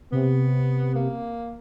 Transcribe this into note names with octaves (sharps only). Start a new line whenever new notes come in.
C3 B3
A#3